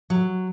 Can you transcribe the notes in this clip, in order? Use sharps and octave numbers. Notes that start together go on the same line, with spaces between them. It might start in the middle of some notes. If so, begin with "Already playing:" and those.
F#3